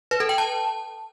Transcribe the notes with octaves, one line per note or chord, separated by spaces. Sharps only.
B4
A4
G5
A5